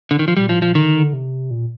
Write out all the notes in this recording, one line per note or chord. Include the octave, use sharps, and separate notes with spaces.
D3
D#3
F3
A#2 G3
A2 F3
A#2 F3
D3 D#3
D3
C3
A#2